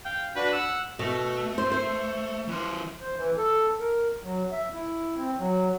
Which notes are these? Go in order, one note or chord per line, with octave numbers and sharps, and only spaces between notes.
F5 G5
D4 F#4 B4
F#5 E6
B2 A3
C5
C5
E3 C5
C5
E3
A4
A#4
F#3
E5
E4
C4
F#3